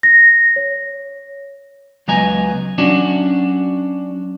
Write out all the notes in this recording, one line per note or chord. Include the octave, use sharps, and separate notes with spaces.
A#6
C#5
C#2 F#3 B3 D#5 G#5 A#5
F#3 C#4 D4 F#4